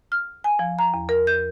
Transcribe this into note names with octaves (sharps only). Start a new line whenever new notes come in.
F6
G#5
F3
A#5
E2
A#4
G6